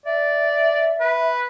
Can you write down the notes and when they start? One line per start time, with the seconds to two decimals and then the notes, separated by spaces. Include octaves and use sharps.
0.06 D5 E5
1.00 B4